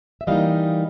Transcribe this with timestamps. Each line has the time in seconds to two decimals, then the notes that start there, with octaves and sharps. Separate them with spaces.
0.21 E5
0.27 E3 G3 A#3 D#4 D#5 F5